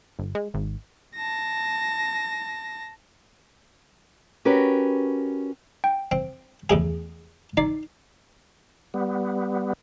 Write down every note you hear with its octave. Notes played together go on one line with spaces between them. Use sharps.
G1
G#3
G#1
A5 A#6
C#4 F#4 G4 A#4 B4
G5
C4
E2 A2 G#4
D#4 D5 C7
G3 B3